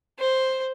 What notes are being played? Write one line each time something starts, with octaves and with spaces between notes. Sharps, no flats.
C5